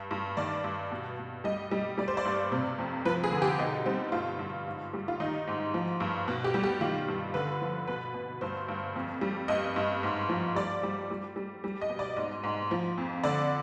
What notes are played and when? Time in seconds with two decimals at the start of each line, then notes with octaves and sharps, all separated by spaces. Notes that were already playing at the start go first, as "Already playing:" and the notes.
Already playing: G2
0.11 G2
0.37 D#3 D5
0.64 G2
0.92 B2
1.18 B2
1.44 G3 D#5
1.71 G3
1.98 G3 D5
2.08 C5
2.17 D5
2.25 G2
2.52 C3
2.79 F2
3.05 F3 B4
3.24 G#4
3.32 D3
3.42 G4
3.59 B2 D#4
3.86 G3 C4
4.12 G2 F4
4.39 G2
4.67 G#2
4.93 G3
5.08 F4
5.20 D#3 D#4
5.47 G#2
5.74 F3
6.00 G2
6.28 B2
6.44 G4
6.54 G3
6.63 G4
6.81 D#3 F4
7.08 G2
7.34 D3 B4
7.61 F3
7.87 B2 B4
8.14 B2
8.41 G2 C5
8.68 G2
8.96 F2
9.21 G3
9.48 G2 D#5
9.76 G2
10.03 G#2
10.29 F3
10.55 G3 D5
10.83 G3
11.10 G3
11.36 G3
11.64 G3
11.81 D#5
11.90 B2
11.99 D5
12.16 G#2 D#5
12.43 G#2
12.71 F3
12.98 F2
13.24 D3 D5